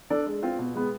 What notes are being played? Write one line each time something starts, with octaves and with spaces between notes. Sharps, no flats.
D4 A4 D5
G#3
C4 F4
B2
G#3 B3